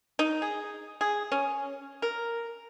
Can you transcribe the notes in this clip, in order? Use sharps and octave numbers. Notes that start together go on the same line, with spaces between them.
D#4
G#4
G#4
C#4
A#4